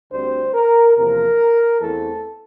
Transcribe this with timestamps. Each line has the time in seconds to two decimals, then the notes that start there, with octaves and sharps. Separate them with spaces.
0.12 D2 D3 G3 C4 C5
0.54 A#4
0.96 E2 C3 F3 A#3 A#4
1.81 E2 E3 A3 C4 A4